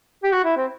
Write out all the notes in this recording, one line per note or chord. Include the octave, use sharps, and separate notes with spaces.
G4
F#4
E4
C4